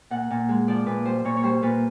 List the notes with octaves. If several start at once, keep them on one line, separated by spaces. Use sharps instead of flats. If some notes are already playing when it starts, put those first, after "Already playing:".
A#2 F#5
A#2
G#3
F3 D5
A#2 B4
G3 C5
A#2 C#5
C#5
G3 C5
A#2 B4